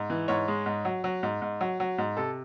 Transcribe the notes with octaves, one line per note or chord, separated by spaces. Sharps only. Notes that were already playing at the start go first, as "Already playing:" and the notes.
Already playing: G#2
E3
G#2 C#5
G#3
G#2
F#3
F#3
G#2
G#2
F#3
F#3
G#2
C3 A4